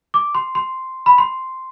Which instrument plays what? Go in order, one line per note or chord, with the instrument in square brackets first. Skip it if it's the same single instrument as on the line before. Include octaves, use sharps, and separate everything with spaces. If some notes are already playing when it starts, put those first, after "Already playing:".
[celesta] D6
C6
C6
B5
C6